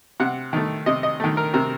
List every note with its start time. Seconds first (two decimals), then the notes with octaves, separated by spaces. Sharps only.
0.20 C3 F#5
0.53 D#3 A3
0.86 C3 D#5
1.03 D#5
1.20 D#3 A3
1.37 A#4
1.54 C3 A#4